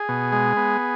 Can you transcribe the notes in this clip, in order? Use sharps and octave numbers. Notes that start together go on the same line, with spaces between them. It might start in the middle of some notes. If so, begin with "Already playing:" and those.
Already playing: G#4
B2
G#3
B3